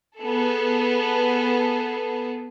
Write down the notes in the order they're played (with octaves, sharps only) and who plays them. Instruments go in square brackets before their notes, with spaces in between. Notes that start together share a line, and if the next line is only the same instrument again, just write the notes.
[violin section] B3 G#4 A4